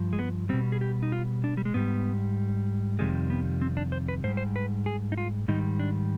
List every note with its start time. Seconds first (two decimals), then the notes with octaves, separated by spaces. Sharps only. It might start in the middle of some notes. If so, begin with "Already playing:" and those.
Already playing: G2 F3
0.13 G#3
0.19 B3
0.49 B2 G3 C4
0.72 G#4
0.81 G4
1.03 D#4
1.12 F4
1.44 D4
1.57 G3
1.65 G#3
1.74 G#2 G3 B3
2.99 F2 C3 D#3 G3 G#3
3.30 B3
3.62 C4
3.77 D4
3.92 C5
4.08 B4
4.24 G#2 C5
4.28 G3
4.37 C5
4.56 B4
4.86 G#4
5.12 D#4
5.18 F4
5.48 G#2 D#3 G3 D#4
5.80 D4